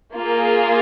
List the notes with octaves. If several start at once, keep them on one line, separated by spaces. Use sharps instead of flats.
A#3 F4 G#4